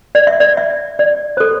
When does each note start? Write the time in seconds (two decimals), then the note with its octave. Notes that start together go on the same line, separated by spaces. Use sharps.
0.15 D5
0.27 E5
0.40 D5
0.57 E5
0.99 D5
1.37 C5
1.40 A4